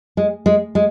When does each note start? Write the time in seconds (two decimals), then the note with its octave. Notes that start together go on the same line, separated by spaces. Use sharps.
0.17 G#3
0.46 G#3
0.75 G#3